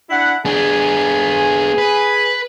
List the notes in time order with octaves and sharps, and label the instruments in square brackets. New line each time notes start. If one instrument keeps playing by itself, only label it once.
[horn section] D4 E4 F#5
[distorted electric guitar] B3 D4 [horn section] G#4 G#5
[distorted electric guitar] B4